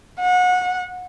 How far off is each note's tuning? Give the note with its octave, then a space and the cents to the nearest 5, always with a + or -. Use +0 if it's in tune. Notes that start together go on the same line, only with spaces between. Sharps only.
F#5 -30